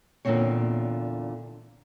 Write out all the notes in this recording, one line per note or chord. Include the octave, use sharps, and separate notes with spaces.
E2 A#2 D3 D#3 C4 C#5